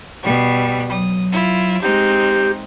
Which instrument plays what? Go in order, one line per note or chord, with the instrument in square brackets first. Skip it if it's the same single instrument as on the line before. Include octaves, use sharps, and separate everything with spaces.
[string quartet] B2 G3
[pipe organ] F#3 [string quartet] D#6
[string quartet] E4 F4
[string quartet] G#3 C4 D#4 [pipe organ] G4 G6